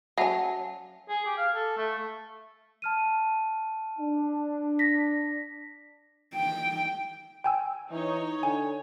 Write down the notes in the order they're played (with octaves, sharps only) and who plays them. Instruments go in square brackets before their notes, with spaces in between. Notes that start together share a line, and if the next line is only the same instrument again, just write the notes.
[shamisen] F#3 C#4 [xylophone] E5 F#5 A5
[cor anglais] G#4
G4
F5
A4
A3
[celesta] A5 F6 D#7
[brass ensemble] D4
[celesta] A#6 B6
[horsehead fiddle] G5
[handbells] G5 G#5 E6
[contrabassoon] E3 [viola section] D#4 C#5
[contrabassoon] D3 [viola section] C#5 [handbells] G#5